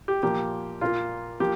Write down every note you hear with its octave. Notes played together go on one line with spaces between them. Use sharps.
G4
A#2 F3 A#3 G4
A#2 A#3 F4
F3 A#3 G4